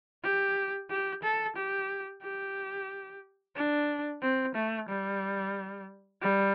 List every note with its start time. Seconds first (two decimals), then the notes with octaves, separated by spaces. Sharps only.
0.24 G4
0.90 G4
1.23 A4
1.56 G4
2.23 G4
3.56 D4
4.22 C4
4.55 A3
4.89 G3
6.22 G3